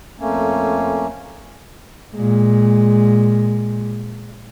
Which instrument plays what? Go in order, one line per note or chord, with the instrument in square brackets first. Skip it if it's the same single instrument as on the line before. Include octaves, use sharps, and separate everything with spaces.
[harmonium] F2 A3 A#3 C#4
[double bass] A#2 G#3